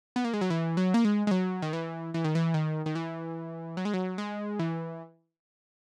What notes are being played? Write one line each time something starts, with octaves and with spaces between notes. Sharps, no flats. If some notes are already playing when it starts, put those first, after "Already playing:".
B3
A#3
G#3
F#3
E3
F#3
A#3
G#3
G#3
F#3
D#3
E3
E3
D#3
E3
D#3
D#3
E3
F#3
G#3
F#3
G#3
E3